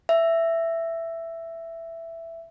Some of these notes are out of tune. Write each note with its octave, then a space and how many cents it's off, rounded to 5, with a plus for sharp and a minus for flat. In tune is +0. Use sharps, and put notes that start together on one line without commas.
E5 +10